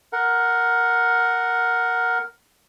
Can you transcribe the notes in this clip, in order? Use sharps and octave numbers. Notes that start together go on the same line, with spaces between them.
A#4 F#5